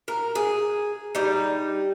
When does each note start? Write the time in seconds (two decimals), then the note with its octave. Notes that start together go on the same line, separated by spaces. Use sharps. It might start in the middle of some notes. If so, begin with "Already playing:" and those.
0.08 A#4
0.35 G#4
1.15 G3 D#4